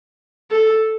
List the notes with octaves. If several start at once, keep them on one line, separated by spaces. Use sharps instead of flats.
A4